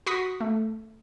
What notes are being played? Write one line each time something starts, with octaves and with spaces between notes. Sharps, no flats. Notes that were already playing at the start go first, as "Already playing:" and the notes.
F#4 B5 C#6 D#6 A#6 B6
A3